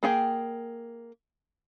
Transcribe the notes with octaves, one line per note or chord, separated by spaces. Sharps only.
A#3 G#4 G5